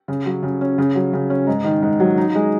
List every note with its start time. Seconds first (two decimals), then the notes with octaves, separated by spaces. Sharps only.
0.08 C#3
0.26 F#3
0.43 C#3
0.61 C#4
0.78 C#3
0.95 F#3
1.13 C#3
1.30 C#4
1.47 G#2
1.64 D#3
1.82 G#2
2.00 F#3
2.18 D#4
2.35 G#3